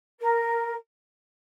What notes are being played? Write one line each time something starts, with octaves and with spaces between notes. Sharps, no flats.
A#4